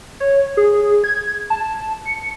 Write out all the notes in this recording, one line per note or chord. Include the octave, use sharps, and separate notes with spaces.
C#5
G#4
G#6
A5
C#7